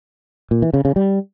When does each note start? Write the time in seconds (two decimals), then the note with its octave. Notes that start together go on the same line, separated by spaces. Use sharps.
0.51 A#2
0.62 E3
0.74 C#3
0.85 C#3
0.96 G3